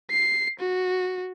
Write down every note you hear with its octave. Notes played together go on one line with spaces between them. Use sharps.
C7
F#4